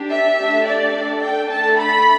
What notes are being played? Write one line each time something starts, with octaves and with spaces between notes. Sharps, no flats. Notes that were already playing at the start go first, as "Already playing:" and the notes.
Already playing: D4 G4
E5
A3 D4 G4
D5
D4 A4
G5
A3 D4 A4 A5
B5